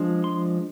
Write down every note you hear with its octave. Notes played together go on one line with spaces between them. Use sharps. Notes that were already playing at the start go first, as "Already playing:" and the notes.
Already playing: F3 G#3 D4
C6